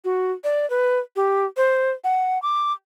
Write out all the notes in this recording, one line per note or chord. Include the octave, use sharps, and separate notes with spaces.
F#4
D5
B4
G4
C5
F#5
D6